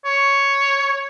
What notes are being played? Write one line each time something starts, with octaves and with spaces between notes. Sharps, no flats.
C#5